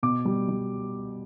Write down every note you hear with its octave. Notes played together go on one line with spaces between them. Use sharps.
B2 D6
G3
G3